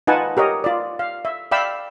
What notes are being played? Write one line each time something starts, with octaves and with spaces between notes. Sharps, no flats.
D#4 F4 B4 F#5 G#5 A5
G4 A#4 C#5 D#5
F4 D5
F5
E5
D5 E5 F5 G5 B5 E6